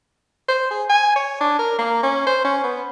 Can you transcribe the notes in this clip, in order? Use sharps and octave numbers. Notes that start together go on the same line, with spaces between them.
C5
G#4
G#5
C#5
D4
A#4
A#3
C#4
C5
C#4
B3